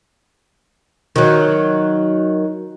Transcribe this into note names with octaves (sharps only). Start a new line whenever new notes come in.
D#3 F#3